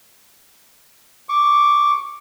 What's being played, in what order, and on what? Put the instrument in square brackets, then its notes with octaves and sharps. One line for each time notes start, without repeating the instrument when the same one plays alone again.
[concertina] C#6 D6